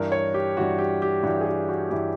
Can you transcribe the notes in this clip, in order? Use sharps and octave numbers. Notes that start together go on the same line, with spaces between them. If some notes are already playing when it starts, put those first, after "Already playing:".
Already playing: G2 E3 A#4
C#5
G4
G2 E3 F#4
G4
G4
G2 E3 F#4
G#4
G4
F#4
G2 E3 G4